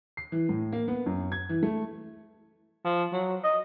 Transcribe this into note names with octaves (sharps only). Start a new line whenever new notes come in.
C7
E3
A2
A#3
B3
F#2
G#6
E3
A3
F3
F#3
D#5